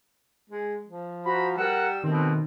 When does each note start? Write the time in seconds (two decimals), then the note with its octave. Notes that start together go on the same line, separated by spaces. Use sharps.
0.50 G#3
0.85 F3
1.26 F#4 C5 A#5 B5
1.58 G3 A#4 F#5 E6
2.04 B2 D#3 A3 C4